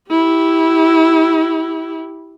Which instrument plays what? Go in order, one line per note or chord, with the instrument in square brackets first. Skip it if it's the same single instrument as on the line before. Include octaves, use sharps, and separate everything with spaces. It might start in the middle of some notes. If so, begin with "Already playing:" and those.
[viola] E4 G4